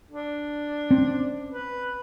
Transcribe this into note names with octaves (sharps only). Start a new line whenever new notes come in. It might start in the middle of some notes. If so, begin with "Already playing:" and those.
D4
C4 C#4
B4